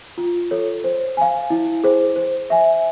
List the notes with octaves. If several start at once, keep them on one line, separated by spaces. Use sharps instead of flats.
F4
A4 C#5
C5
F5 G#5
E4
G#4 C5
C5
E5 G#5